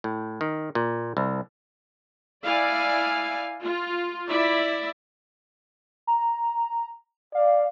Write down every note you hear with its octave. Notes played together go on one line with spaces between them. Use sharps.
A2
D#3
A#2
C2
E4 D5 F5 G#5
F4
E4 D5 E5
A#5
D5 F5